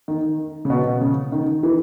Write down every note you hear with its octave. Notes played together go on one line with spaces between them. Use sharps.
D#3
C#3
B2
C#3
D#3
E3